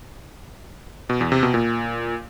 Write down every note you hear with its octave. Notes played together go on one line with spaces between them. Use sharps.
B2
E2
C3
B2
A#2